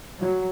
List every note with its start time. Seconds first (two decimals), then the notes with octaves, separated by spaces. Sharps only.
0.21 F#3